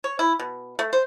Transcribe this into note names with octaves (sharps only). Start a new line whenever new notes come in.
C#5
E4
B2
A3
C5